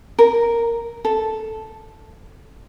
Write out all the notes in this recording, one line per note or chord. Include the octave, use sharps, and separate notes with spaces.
A#4
A4